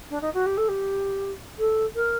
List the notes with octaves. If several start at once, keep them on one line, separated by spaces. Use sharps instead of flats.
D4
D#4
F#4
G4
A4
G4
A4
A#4